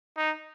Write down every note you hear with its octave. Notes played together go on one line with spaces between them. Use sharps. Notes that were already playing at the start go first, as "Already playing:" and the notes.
D#4